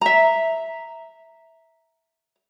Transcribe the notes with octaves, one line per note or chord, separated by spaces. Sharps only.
E5 A#5